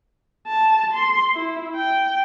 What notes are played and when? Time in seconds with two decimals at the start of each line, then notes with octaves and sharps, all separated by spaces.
0.47 A5
0.94 C6
1.35 E4
1.75 G5